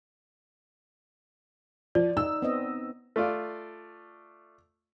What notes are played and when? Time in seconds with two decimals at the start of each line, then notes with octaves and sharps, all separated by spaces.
1.95 F3 D5
2.17 D#4 E6
2.42 B3 C4 D#5
3.16 A3 F4 D5